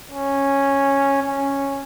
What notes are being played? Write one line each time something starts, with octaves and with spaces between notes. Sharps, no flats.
C#4
C#4